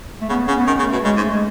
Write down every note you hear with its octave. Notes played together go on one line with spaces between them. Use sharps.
A3
C#3 B3
C#3 C#4
B3
D#3 C#4
C#3
A3
B2
C#3 G#3
G#2
A3
G#3